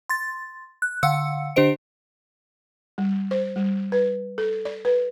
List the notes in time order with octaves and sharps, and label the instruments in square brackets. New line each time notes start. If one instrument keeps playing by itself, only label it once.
[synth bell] C6 A6
F#6
D3 F5 F#5 E6 C#7
D3 D4 G4 C5 D#5 D7
[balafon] G3
C5
G3
B4
A4
D5
B4